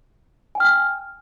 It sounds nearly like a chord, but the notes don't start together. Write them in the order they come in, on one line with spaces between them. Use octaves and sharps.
G#5 G5 F6